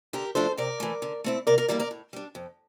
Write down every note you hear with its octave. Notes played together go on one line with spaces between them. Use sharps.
D3 G4 A#4
F3 A3 D4 A4 C5
C3 A#4 D5
E3 A3
D3
A3 C4 E4
C3 A#4 D5
A#4 D5
E3 G3 A#3 E4 A#4 D5
A#4 D5
A2
G3 D4
F2